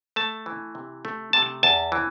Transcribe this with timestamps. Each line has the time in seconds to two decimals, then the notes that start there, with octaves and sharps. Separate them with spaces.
0.16 A3 A5
0.46 E3
0.75 C3
1.05 A3
1.33 C3 A5
1.63 E2 A5
1.92 E3